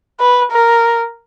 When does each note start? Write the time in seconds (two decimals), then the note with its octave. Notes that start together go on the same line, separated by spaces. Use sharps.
0.20 B4
0.52 A#4